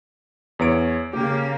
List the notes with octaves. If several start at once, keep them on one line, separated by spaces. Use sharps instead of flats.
E2 C#5 D7
C#3 A#3 G4